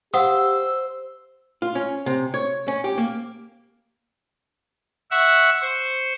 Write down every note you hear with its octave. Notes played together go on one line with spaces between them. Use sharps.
G4 C5 F5 F#5 D#6 E6
F4
C#4
C3
C#5
C#4
G4
A#3
E5 F#5 C#6
C5 C#6